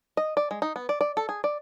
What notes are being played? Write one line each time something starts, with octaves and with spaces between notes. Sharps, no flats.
D#5
D5
G#3
D#4
B3
D5
D5
A4
G#4
D5